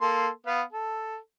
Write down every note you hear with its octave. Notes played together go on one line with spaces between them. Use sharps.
A#3 A4 C6
B3 B4 F5
A4